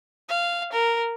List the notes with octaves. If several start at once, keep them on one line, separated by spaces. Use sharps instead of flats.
F5
A#4